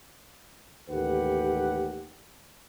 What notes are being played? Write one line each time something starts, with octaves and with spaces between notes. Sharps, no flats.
A1 D#2 G4 A4 B4 F#5